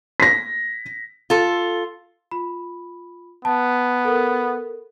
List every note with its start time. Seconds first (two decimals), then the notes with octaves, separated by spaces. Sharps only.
0.20 A#6 B6
1.30 F4 A4
2.31 F4 B5
3.45 B3 A5
4.05 A4 A#4